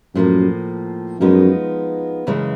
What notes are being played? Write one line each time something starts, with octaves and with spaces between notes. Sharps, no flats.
F#2 A2 F3 A#3
F#2 F3 G#3 B3 D#4
F#2 C#3 E3 G#3